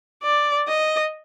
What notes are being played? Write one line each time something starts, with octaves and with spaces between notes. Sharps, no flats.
D5
D#5